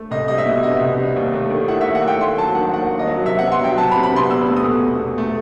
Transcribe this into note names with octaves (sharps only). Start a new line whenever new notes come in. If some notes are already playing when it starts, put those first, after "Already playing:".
Already playing: A3
C2 D#5
G3 D#5
E5
B2
B3 D#5
C2
G3
D#2
A3
D#3
E4 F#5
D#2 E5
F#5
A3 G5
D#2 C6
F#3 A5
D#3 F#5
D#2 F#5
D#2
D#5
F#3
C3 E5
B3 F#5
C6
F#3 G5
C3 A5
B5
C3
B5
B3 C6
E2 E6
A3
D#6
B2
E2
E2
A3